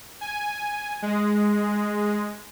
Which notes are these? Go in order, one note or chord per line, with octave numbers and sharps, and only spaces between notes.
G#5
G#3